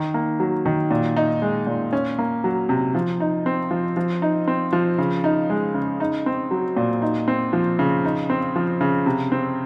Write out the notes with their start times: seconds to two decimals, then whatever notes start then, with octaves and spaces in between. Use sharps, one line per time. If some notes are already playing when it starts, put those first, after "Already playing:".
Already playing: D#3
0.14 A#3
0.40 F#3
0.65 D#3
0.91 A#2
1.17 D#4
1.42 G#3
1.67 A#2
1.93 C#4
2.19 A#3
2.44 F#3
2.69 C3
2.95 F3
3.20 D#4
3.46 C4
3.71 F3
3.97 F3
4.22 D#4
4.48 C4
4.73 F3
4.98 C#3
5.24 D#4
5.50 G#3
5.75 C#3
6.00 D#4
6.26 C4
6.51 F#3
6.77 A#2
7.02 D#4
7.28 C4
7.53 F3
7.79 C#3
8.05 D#4
8.30 C4
8.56 F3
8.81 C#3
9.06 C3
9.32 C4